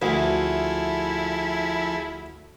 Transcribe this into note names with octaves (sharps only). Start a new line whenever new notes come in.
D2 F3 E4 G#4 A4